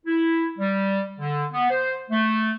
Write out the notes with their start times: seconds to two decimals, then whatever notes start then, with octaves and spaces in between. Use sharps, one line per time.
0.06 E4
0.59 G3
1.20 D3
1.53 B3
1.70 C5
2.11 A3